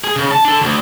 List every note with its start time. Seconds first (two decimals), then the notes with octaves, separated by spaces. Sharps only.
0.04 G#4
0.16 C#3
0.31 A5
0.45 D4 A4
0.61 D2